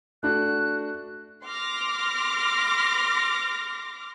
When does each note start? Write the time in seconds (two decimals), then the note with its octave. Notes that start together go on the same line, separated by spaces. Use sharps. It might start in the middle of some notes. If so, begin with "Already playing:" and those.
0.23 A3 D4 F#4 F#6
1.45 C6 D6 F6 A#6